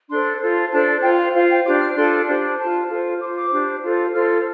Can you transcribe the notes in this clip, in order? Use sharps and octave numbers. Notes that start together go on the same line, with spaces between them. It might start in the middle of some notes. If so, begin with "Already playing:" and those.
D4 A4 C5 C6
F4 A4 C5
D4 A4 C5 A5
F4 C5 G5
F5
F4 C5 F5
G5
D4 G4 C5 D6
F6
D4 F4 A4 C6
D4 G4 C5
F4 C5 A5
F4 A4 C5
F4 C5 D6
D6
D4 G4 C5
F4 A4 C5
F4 A4 C5 F6